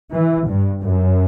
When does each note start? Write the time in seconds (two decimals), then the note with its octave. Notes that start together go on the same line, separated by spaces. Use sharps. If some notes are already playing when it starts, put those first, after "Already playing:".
0.14 E3
0.48 G2
0.84 F#2